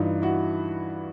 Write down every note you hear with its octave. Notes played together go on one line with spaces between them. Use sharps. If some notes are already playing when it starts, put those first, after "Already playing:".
Already playing: G2 E3 D#4 F4
E4 F#4